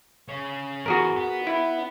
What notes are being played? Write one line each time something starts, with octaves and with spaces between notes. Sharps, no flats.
C#3 C#4
E2 F#4 G#4 A#4
B3
E4